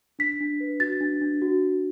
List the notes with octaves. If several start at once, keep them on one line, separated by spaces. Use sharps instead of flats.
D4 B6
D4
B4
F#4 A6
D4
D4
F#4
F#4